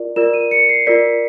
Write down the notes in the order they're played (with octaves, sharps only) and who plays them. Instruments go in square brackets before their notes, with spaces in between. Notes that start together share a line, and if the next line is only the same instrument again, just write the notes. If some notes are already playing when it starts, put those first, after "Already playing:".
Already playing: [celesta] F4 A#4 D5
F4 A#4 D5 E7
D#7
C#7
C7
F4 A#4 D5 B6